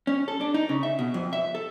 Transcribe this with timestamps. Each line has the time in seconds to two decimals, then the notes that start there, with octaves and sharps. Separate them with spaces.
0.07 C#4
0.28 A4
0.41 D4
0.54 D#4
0.69 C#3
0.83 E5
0.99 B2
1.14 F2
1.33 E5
1.55 A4